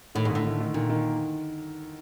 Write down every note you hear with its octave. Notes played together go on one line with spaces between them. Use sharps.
A2 D#3
G#2
D3
A2
D#3
D#3
A#2 D#3
D#3